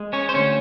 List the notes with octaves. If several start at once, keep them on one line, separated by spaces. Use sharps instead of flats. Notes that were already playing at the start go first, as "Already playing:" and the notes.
Already playing: G#3
C#4 C#5
C5
D2 C#4 C#5